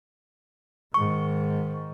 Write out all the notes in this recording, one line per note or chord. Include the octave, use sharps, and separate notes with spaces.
G#2 D#3 C#6